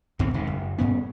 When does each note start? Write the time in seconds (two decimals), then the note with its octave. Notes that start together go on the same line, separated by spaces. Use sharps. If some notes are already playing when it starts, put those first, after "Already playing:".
0.19 D2 B2 D#3 C4
0.34 D1 C#2 C3 D#3
0.47 F#1
0.78 G2 B3 C#4